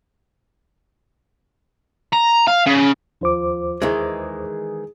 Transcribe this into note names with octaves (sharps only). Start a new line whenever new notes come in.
A#5
F5
C#3
D#2 F3 C5 D6
D#3 E3 G#3 G#4